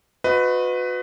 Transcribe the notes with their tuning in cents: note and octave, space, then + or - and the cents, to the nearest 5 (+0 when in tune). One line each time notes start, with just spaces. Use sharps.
F#4 -35 B4 +20 D#5 +0